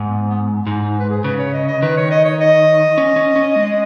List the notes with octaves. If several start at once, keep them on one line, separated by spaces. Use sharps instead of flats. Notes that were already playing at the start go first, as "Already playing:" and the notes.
Already playing: G#2
B3
B3
G#2 D#4
D#4
B4
G#4
C#3 B4
C#5
D#5
D#5
D#3 B4
C#5
D#5
C#5
D#5
C#4
C#4
C#4
G#3